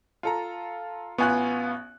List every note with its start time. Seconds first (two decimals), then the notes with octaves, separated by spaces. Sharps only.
0.23 F4 A4 A#5
1.18 A1 B3 F4 G#5 C#6 F#6